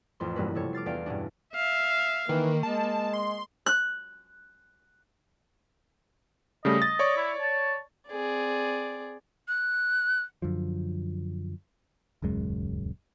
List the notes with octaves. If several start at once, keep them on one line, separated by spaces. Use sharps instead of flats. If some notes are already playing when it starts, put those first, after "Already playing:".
A1 F2 C6
E1 G2 A#3 C#4 B4
F1 C3 A4 C#5
D6 F6 A6 C7
E2 D4 D5 F5 G5 D7
G2 B2 C#4 D4
E5 F5
D#3 E3 A#3
G#3 A5
C6
F#6
C#3 G3 A3 D#5
A6
C#5 D5 C#6
E4
A5
C4 G#4 D5
F#6
F#2 D3 F3
D#1 C#2 F#2 G#3